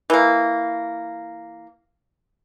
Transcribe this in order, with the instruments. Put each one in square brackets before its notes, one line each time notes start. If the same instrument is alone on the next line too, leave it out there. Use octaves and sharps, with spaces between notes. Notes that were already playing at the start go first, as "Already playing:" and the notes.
[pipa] E3 A#3